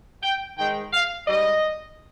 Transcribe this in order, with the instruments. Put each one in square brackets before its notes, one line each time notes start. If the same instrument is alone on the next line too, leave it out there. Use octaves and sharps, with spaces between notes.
[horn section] G5
G#2 D#3 G#3 G5
F5
G#2 G3 D#5